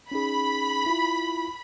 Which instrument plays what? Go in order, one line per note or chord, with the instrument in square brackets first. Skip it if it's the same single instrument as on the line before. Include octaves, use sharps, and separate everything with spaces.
[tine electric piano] C#4 D#4 G#4 [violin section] B5
[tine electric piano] E4 F4